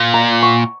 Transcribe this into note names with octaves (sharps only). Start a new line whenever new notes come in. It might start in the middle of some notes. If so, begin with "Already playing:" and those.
Already playing: A#2
A#5
C#6